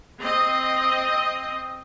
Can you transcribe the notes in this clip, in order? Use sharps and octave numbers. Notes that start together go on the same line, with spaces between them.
C4 D#5